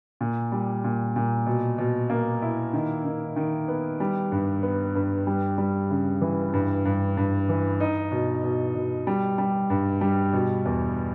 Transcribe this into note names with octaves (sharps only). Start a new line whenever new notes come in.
A#2
G3
A#2
A#2
B2
B2
A#3
E4
D#3
D#3
D#3
B3
G3
G2
B3
G2
G3
G3
C#3
E3
G2
G2
G2
E3
D#4
B2
B2
B2
G3
G3
G2
G3
B2
E2